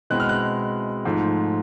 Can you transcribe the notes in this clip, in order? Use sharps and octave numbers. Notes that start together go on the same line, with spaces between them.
B2 G#3 C4 E4 F#6
F6
F#6
G#2 F3 A3